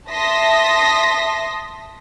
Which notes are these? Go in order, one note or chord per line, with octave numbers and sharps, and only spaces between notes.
E5 A5 C6 D#6 A#6 B6